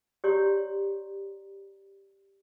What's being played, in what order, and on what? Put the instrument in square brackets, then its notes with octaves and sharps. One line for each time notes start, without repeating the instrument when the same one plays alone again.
[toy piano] G4 C#5 D5 A#5 C6